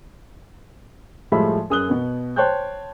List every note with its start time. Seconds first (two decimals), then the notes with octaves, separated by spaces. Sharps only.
1.32 A2 F3 G3 G#3 E5 B5
1.70 F#2 G#4 D#6 F#6 G7
1.89 B2 B3
2.36 C5 C#5 G5 A5 F#6 G6